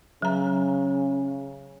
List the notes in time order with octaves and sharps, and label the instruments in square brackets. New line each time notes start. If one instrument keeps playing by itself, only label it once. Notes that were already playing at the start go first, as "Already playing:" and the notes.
[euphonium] C#3 [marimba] F#3 A#5